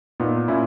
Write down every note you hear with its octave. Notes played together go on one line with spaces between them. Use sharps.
A#2 B3 D#4
A#2 C#4 E4